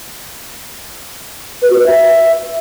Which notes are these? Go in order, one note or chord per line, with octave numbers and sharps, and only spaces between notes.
B4
F#4
B4
E5